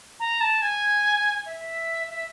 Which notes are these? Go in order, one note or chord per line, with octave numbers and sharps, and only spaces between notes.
A#5
A5
G#5
E5
E5